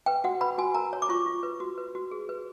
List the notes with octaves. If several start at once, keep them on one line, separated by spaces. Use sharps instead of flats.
B4 G5
F#4 F#5
B4 B5
F#4 G#5
A#4 A#5
C#5
D6
F4 C#6
F4
B4
F#4
B4
F#4
G#4
B4